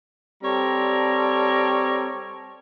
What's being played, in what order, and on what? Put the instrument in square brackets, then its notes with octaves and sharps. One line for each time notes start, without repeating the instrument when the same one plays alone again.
[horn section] G3 C4 A4 C#5 D5 A#5